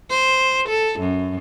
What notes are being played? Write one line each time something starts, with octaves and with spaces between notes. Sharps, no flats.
C5
A4
F#2